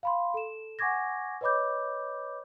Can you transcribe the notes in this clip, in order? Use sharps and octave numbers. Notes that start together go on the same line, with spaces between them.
F5 B5 C6
A4 E7
F#5 G#5 C#6 D6 G#6 A#6
B4 C#5 D#5 B5 D6 G6